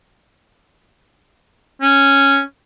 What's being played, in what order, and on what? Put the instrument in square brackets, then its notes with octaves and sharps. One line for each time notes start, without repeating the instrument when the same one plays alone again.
[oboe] C#4